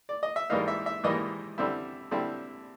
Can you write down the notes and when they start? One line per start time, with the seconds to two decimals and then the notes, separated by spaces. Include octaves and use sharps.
0.09 D5
0.23 D#5
0.36 E5
0.50 G#2 E3 G3 A#3 D#4 F5
0.68 E5
0.86 E5
1.04 G#2 E3 G3 A#3 D#4 D#5
1.58 D3 G3 C4 E4
2.11 D3 G3 C4 E4